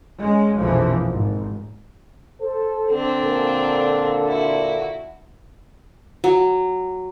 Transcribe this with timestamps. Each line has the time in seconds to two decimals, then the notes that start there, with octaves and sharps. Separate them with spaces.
0.20 G#3 C#4
0.56 A#1 F2 B2 E3 F3
1.09 G#1
2.40 A4 C5
2.91 D3 C4 D4
3.22 A#2 D3 A4
4.27 E4 F#4
6.24 F#3